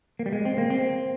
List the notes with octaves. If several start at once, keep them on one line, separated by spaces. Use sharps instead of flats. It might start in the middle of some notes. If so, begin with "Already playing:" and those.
A#3
G3
G#3
C4
A#3
C4